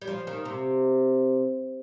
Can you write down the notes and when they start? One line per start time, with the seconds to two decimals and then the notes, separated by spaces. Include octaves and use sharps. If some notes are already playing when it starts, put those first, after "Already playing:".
0.02 G3
0.07 F3
0.27 D#3
0.45 C3